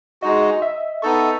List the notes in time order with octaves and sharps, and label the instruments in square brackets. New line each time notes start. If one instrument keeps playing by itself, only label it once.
[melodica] G#3 D#4 F#4 [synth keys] D#5
[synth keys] D#5
E5
[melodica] B3 D#4 A4 [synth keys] C#6